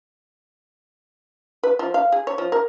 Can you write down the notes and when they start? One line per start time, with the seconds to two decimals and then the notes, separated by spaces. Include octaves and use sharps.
1.63 B4
1.79 F3
1.94 F5
2.12 G#4
2.27 C#5
2.38 F3
2.52 A#4